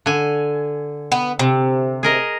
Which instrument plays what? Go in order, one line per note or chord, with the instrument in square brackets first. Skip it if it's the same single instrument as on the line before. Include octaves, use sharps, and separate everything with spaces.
[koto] D3 G#5
[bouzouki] B3
C3
[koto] G#4 A#4 D#5